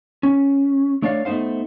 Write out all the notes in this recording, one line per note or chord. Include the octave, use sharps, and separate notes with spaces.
C#4
A3 D4 C#5 D5 F5
A3 B3 D#4 C5 F5